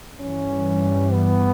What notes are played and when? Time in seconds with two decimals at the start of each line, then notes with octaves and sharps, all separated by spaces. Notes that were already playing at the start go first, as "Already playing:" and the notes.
0.20 G2 E3 G3 C#4
1.12 B3